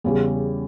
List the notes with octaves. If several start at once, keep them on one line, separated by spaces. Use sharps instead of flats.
E2 C#3 G3